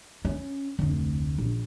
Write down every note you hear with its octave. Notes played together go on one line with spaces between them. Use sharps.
C#4
F1 D2
A#1